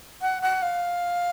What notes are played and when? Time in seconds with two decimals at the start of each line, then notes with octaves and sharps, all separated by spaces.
0.22 F#5
0.42 F#5
0.62 F5